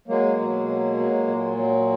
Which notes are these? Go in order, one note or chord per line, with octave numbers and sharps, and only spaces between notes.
F#3 G#3 A#3
B2
F#3
F#3
A#2
F#3